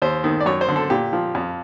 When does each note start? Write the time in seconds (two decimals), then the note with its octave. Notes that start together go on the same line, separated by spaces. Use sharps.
0.02 D#2 C5
0.24 D#3
0.40 D5
0.46 F#2 C#5
0.61 C5
0.69 D3
0.76 A4
0.90 A#2 G4
1.13 F3
1.35 F2